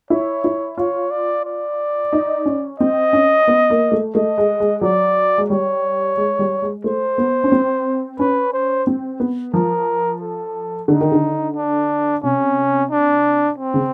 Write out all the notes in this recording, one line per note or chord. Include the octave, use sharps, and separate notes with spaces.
E4 C#5
E4
F4 C#5
D5
D5
D#4
C#4
C4 D#5
C#4
B3
A#3
A3
A3 D#5
G#3
G#3
F#3 D5
G#3
G3 C#5
G#3
G3
G#3
A3 C5
B3
C#4
C4
C#4 B4
C5
C4
B3
F3 A#4
A4
D3 D#4
D#3
D3
D4
C3 C#4
D4
C4
C#3